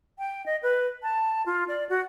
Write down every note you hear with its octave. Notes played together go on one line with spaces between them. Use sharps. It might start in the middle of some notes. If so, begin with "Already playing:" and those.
G5
D#5
B4
A5
F4
D5
F#4